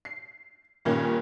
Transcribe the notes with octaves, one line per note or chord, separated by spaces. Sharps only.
C7
G2 A#2 D#3 A#3 C#4